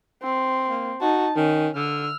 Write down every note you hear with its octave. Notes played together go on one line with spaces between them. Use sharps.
C4
A#3
D#4 F#4 A5
D#3 C#4
D3 E6 F6